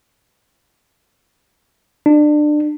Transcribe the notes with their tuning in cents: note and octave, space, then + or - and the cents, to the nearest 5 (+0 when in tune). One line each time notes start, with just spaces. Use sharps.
D4 +25